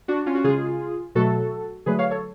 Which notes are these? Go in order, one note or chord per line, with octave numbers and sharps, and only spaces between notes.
D4 F#4
C#4 F4
F#4
C#3 G#3 F4 G#4
B2 F#3 A3 F#4 A4
D3 F#3 A3 G#4 B4
C#5 F5
A4 C#5